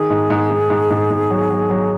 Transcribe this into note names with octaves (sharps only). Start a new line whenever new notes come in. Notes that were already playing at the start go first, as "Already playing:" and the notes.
Already playing: D#3 G#4
G#2
G#2
G#2
G#2
G#2
G#2
F#3
F#3
F#3